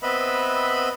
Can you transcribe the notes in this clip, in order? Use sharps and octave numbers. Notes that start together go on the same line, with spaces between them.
B3 C4 B4 D#5 E5 B5